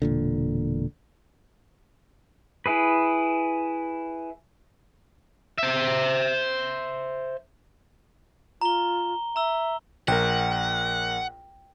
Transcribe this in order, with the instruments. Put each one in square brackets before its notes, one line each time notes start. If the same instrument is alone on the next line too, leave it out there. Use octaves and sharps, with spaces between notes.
[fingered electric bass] E1 A#2 D3
[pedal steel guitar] E4 G#4 B4
[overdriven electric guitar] C5 E5
[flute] F4 [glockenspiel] A#5 G7
[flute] E5 [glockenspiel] A#5 E6 G7
[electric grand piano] A#1 A#4 [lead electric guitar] F#5 [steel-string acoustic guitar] G5